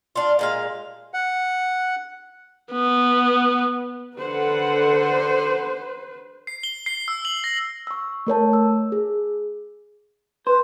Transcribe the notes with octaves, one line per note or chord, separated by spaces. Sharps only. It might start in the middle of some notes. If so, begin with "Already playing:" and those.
D4 F4
A#2 G#3 F5
F#5
B3
D3 B4 C5 F#5
C7
G7
C7
E6
F#7
A#6
C#6 E6
A3 A#4 C#5 A5
E6
G#4
B4 C5